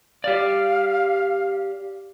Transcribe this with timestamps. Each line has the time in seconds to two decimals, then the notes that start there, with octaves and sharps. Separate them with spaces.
0.24 G4 D5 F5